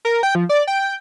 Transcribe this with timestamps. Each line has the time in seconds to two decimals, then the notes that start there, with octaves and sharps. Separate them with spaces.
0.05 A#4
0.23 G5
0.35 F3
0.49 D5
0.67 G5